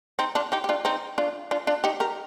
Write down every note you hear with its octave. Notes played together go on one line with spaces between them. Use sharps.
C4 D#4
D4 F4
D#4 G4
G4
D4 F4
C4 D#4
D4 F4
D4 F4
D4 F4
D#4 G4
G4 A#4